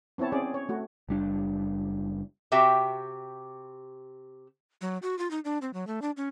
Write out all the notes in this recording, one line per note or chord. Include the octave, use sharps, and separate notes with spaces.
B3 C4 E4 C#5 A5
C4 C#4 G#4 D5
C#5
A3 F#4
F#1 G3 D4
C3 F#4 G4 E5 G5
F#3
F#4
F4
D#4
D4
C4
F#3
A3
D4
C#4